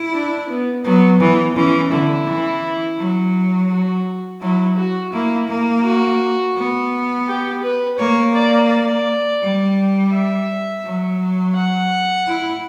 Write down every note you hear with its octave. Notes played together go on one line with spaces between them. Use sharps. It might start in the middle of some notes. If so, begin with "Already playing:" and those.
Already playing: E4
D4
B3
F#3 B3
E3 B3
E3 C#4
D3 E4
E3
F#3
F#4
F#3 E4
F#4
A#3 E4
A#3
F#4
B3
G4
B4
A#3 C#5
D5
D5
G3
E5
F#3
F#5
E4